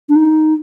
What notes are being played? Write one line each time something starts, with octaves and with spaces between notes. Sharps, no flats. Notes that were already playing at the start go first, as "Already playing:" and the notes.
D4
D#4